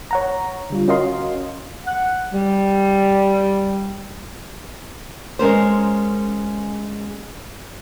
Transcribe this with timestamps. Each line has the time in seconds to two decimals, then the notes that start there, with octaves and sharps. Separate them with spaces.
0.11 C#5 F#5 A#5
0.70 D3 G3 F4
0.88 C#4 F#4 A#4 D#5 F5 C6
1.86 F#5
2.33 G3
5.39 G#3 C#4 A#4 C5